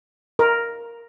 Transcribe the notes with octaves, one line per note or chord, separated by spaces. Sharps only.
A#4